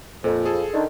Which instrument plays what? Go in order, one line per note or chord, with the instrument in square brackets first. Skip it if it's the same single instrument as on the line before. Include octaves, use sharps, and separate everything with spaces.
[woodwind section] F2 [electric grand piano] A#2
[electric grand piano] G#4 A4
[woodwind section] D3 D#3